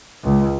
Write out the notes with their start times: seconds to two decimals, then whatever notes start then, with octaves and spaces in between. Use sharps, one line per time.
0.24 C#2